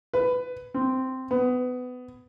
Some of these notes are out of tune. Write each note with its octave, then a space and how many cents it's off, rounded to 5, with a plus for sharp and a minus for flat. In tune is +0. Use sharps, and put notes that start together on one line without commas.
B4 +15
C4 -5
B3 +25